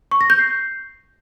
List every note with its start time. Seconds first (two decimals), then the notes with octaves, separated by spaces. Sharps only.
0.11 C#6
0.21 A#6
0.30 G6
0.39 C7